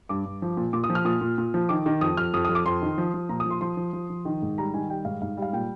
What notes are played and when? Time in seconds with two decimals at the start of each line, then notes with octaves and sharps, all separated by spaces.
0.09 G2 D6
0.25 G2
0.42 F3
0.57 A#2
0.73 A#2 D6
0.84 D#6
0.90 F3
0.95 F6
1.05 A#2 D#6
1.21 A#2
1.38 A#2
1.54 F3
1.69 D#3 D6
1.86 D#3
2.01 F2 D#6
2.17 F2 F6
2.34 F2 D#6
2.45 D#6
2.49 F2
2.55 D6
2.65 F2 C6
2.82 D#3
2.98 F3
3.14 F3
3.29 A#2 A#5
3.40 D#6
3.46 F3 C6
3.61 F3 C6
3.77 F3
3.93 F3
4.10 F3
4.25 D#3
4.42 G#2
4.58 G3 A#5
4.74 D#3 G#5
4.90 G3 G5
5.05 G#2 F5
5.22 G#2 F5
5.37 G3
5.42 F5
5.53 A#2 G5